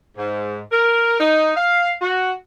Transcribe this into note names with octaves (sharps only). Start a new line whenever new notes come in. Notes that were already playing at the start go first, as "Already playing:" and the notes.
G#2
A#4
D#4
F5
F#4